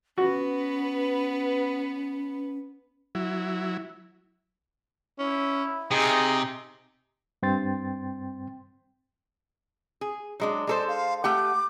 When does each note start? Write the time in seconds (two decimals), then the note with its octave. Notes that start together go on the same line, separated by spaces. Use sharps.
0.18 B3 C#4 F#4 B4
3.15 F#3 E4
5.19 C#4 E4
5.91 C3 D#4 G#4
7.43 G2 C4 G5 C6 A6
10.01 G#4
10.40 F#3 G#3 D4
10.67 G#3 A4 C5 D5
10.88 F5
11.24 A3 G4 F#5 D6